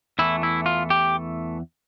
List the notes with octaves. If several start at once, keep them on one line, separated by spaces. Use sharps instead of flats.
E2 E3 A3 E4
E4
F4
G4